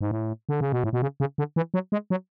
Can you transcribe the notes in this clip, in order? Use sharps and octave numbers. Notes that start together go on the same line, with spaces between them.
G#2
A2
D3
C#3
B2
A2
B2
C#3
C#3
D3
E3
F#3
G#3
F#3